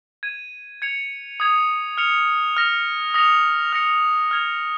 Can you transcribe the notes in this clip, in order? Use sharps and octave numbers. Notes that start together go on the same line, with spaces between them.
G#6 D#7
G#6 C#7 F7
D#6 G#6 F7
F6 C#7 F7
F6 A#6 F7
D#6 A#6 C#7 F7
F6 A#6 C#7
F6 G#6 F7